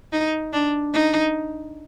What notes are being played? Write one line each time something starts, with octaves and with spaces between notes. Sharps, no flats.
D#4
D4
D#4